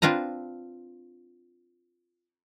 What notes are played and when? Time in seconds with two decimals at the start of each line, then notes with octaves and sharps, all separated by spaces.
0.02 C4 D4 F4 B4 A#5